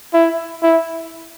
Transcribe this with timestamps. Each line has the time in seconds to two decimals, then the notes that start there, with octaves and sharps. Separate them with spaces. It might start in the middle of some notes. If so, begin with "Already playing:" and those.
0.14 E4
0.63 E4